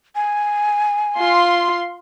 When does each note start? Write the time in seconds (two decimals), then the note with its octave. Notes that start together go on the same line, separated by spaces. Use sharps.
0.15 G#5
1.18 F4 C6